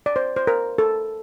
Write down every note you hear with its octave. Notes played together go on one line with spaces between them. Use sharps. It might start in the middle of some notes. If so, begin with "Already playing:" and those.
D5
C5
C5
A#4
A4